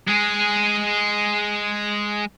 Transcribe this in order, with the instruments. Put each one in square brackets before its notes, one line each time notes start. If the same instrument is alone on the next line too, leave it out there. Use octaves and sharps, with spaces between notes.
[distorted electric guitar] G#3 G#4